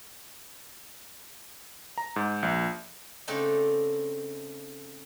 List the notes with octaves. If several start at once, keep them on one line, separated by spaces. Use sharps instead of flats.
A#5
G#2
A#1
C#3 A3 C4 D4 D#4 A4